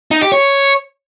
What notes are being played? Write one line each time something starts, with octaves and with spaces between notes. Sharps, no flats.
D#4
G4
C#5